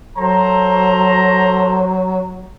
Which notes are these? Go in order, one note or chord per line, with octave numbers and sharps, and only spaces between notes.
F#3 A4 C5 A#5